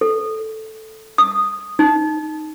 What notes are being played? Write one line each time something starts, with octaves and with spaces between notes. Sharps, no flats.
A4
D#6
D#4